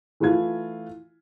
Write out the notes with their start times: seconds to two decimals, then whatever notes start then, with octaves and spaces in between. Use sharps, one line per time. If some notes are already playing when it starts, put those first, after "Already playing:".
0.20 E3 A3 E4 F4 G#6